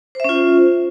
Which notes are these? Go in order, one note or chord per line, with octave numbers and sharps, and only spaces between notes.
C#4 F4 C5 E5